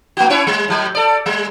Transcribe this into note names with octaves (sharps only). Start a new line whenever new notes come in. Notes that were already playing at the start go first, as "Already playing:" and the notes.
A3 F#4
C#4 E4 C#5
G3
A2 F#3
A4 D5
G3